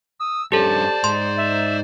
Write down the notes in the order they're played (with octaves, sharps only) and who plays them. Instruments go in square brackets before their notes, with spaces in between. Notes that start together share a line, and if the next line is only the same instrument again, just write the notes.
[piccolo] D#6 [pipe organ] E6
[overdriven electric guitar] G2 C#4 [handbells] G4 A4 [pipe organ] C5 D5 [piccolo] A5
[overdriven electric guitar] G#2 [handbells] C6
[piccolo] E5